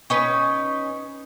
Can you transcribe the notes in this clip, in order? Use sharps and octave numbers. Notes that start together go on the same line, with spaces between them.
C#4 D#4 B4